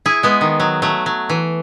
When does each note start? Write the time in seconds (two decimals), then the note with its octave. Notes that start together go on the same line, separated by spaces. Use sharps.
0.06 E4 G#4
0.23 G#3 B3
0.41 D#3
0.60 F#3
0.82 F#3 A3
1.06 F#3
1.30 E3